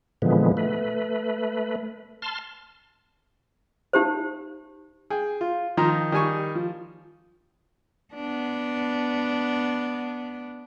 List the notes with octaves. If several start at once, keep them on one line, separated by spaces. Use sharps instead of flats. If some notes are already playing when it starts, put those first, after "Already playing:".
A#2 D3 E3 F3 G#3 B3
A3 B4
A5 C6 F6
D#4 G4 C5
G#4 G5
F4
D#3 F3 A#5 C6
D#3 G3 G#5 C#6
F3
B3 D4